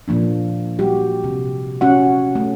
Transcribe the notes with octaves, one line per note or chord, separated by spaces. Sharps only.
A#2 F3 A#3 D4
G3 F#4 G4
C3
C#4 F#4 F#5
A3 C#4